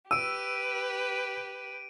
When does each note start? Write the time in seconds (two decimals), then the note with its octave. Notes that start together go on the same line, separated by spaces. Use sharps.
0.11 G4 B4 E6 D7 D#7